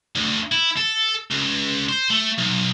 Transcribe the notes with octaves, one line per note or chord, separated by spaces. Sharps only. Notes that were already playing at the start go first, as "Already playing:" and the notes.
D2
E4
A4
C#2
C5
A3
B1